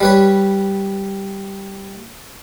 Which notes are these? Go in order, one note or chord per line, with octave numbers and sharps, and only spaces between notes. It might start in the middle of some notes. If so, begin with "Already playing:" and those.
G3 B4 C#5